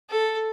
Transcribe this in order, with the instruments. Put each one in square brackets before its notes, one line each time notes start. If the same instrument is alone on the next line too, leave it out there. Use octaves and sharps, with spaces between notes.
[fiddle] A4